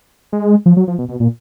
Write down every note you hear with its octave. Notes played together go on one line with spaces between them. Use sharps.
G#3
F3
F#3
F3
B2
B2
A#2